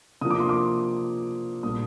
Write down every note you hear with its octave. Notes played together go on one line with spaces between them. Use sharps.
C3 F3 A#3 D4 D#6
D6
C6
D6
A#2 G3 D4 D#6